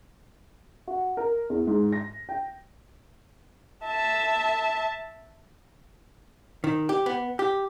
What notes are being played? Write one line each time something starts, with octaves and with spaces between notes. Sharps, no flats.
F#4
A#4
E2
G#2
A#6
G5
E5 A5
D#3
G4
B3
G4